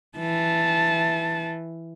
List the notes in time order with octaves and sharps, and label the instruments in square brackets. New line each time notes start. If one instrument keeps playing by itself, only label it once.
[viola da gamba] E3 [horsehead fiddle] A5